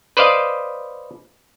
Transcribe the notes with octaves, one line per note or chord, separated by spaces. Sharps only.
B4 C5 D5 D#5 F5